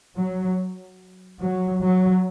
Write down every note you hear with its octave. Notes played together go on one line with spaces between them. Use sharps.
F#3
F#3
F#3